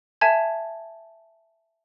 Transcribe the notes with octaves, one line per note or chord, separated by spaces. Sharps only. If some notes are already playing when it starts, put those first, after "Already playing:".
E5 G#5 A5 G#6